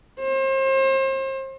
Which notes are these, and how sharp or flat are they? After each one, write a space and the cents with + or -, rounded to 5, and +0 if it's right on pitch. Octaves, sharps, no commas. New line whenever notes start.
C5 +35